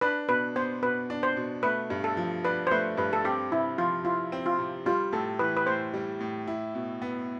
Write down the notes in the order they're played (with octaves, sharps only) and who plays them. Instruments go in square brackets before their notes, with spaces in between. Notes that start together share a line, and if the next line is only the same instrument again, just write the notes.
[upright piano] D4 [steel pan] B4
[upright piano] B2 [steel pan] B4
[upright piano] B3 [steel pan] C5
[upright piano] B2 [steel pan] B4
[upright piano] D4
[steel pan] C5
[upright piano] B2
[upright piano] A3 [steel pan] B4
[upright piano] G2
[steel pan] A4
[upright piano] F3
[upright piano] D4 [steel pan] B4
[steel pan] C5
[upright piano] A3 [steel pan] B4
[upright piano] G2 [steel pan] B4
[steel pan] A4
[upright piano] C4 [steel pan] G4
[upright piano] C3 [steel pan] E4
[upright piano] F3 [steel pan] F4
[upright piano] E4 [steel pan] F4
[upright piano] C4
[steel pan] F4
[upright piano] C3
[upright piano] G3 [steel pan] F4
[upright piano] A2 [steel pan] A4
[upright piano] E3 [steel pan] B4
[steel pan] B4
[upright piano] A2 [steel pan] C5
[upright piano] G3
A2
E4
B2
B3